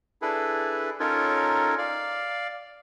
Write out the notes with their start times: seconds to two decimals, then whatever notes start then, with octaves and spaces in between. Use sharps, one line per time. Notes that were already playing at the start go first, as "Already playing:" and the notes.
0.22 D4 E4 G#4 A4 B4
1.00 C#4 D#4 F4 A4 A#4 C#5
1.78 D5 F5